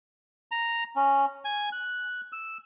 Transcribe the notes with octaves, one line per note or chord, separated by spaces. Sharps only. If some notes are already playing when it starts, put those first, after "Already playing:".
A#5
C#4
G#5
F#6
E6